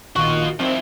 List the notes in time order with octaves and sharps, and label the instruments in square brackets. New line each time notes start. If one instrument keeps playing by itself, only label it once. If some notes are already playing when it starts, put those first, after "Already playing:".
[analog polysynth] A#1 D#3 F4 [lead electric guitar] F#4 D#5 [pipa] C#6
[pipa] D#3 G3 [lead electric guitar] F3 E4 [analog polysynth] C4